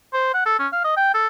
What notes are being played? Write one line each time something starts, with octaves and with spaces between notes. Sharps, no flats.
C5
F#5
A4
C#4
F5
D#5
G5
A4